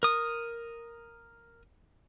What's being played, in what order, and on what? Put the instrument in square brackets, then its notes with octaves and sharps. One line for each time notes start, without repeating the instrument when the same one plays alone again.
[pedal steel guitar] A#4 D#6